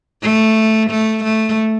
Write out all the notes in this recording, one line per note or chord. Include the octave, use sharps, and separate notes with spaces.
A3
A3
A3